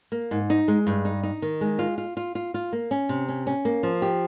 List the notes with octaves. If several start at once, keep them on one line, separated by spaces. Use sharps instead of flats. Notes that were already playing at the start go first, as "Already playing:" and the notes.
A#3
G#2
D#4
G#3
G2
D#4
D#4
D#3
G#3
F4
F4
F4
F4
F4
A#3
C#4
C3
C#4
C#4
A#3
F3
G4